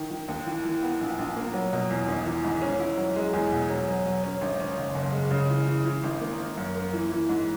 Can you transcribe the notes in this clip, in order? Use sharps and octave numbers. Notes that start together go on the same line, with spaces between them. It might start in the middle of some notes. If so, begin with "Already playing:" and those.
Already playing: D#3
D#3
D#2
E3
E3
B3
A#1
A#1
A#3
F#3
B2
E2
G#1
E3
G#2
C#4
E4
F#3
G#3
E2
B2
F#3
F#3
F#3
C#4
G#1
C#4
F#1
F#1
G#3
C#3
E3
E3
E3
G#1
A#3
A#3
F#2
A#3
E3
E3
G#2